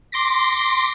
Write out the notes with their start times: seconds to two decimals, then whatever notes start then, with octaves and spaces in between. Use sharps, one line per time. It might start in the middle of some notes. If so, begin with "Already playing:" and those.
0.12 C6 D6 A#6 B6